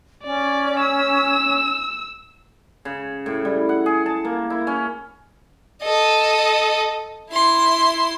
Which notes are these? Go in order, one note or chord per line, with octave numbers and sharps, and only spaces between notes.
C#4 D5
E6
C#3
A2
G3
F#5
G#4
A5
A#3
E4
C#4
A4 D#5
E4 C6